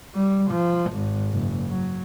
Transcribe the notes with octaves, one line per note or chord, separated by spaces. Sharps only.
G3
F3
G#1
F#1
F#3